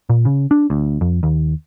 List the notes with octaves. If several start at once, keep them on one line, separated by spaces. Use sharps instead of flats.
A#2
C#3
D4
D2
F2
D#2